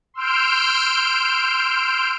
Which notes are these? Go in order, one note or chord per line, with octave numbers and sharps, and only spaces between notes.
C6 E6 F6 G6 D7